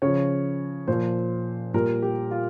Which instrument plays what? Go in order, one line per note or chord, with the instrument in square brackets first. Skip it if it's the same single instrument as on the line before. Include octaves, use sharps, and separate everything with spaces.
[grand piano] C#3 F3 C#5
A#2 F3 C5
A#2 G3 A#4
G4
F4